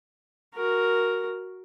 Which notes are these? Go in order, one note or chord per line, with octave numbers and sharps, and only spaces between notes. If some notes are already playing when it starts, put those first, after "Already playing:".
F#4 A#4